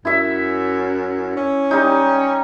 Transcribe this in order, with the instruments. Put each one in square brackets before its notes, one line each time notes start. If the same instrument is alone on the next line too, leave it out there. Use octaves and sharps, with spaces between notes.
[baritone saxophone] F#2 [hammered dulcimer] E4 E5
[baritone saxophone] C#4
[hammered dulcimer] G3 D#4